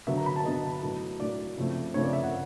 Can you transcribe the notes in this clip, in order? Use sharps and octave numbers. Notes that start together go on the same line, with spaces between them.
D3 F#3 B3 E5
A#5
B5
A5
D3 F#3 B3 D#5
A2 F#3 A3
A2 F#3 A3 D5
C#3 F3 A3 C4
C#3 F3 A3 C4 C#5
D5
E5
F#5